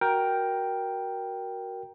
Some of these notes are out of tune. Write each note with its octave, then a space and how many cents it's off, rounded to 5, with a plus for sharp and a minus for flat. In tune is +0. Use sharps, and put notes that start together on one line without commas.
F#4 +5 A#4 +10 G5 +0